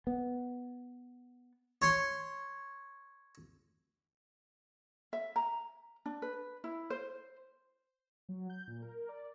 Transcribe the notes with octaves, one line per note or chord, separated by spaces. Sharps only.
B3
C#5 C6
E5
A#5
D4
B4
E4
C5
F#3
G6
A#2
A#4
D5